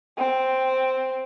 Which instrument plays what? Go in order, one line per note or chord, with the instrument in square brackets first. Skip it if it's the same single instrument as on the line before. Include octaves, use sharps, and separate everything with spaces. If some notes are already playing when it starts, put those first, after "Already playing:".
[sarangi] C4